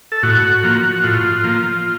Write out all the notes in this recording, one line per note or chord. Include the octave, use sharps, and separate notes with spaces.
A4
A2 F#4
F3 A#3
A2 F4
F3 A#3